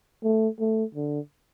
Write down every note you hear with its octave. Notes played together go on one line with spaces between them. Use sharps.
A3
A3
D3